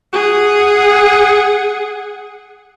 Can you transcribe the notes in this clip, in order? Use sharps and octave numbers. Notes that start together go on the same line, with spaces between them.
G#4 F#5